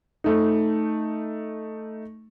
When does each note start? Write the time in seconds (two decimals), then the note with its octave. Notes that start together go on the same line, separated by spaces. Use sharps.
0.24 A3 D#4